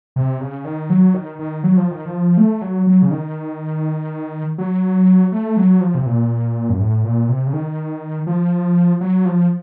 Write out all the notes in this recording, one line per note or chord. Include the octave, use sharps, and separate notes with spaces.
C3
C#3
D#3
F#3
D#3
D#3
F#3
F3
D#3
F3
A3
F#3
F#3
C#3
D#3
F#3
A3
F#3
F3
C3
A#2
F#2
A2
A#2
C3
C#3
D#3
F3
F#3
F3